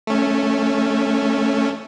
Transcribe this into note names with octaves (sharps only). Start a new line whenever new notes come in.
A3 C#4